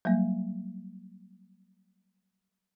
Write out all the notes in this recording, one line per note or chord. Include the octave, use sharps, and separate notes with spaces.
F#3 G3 A#3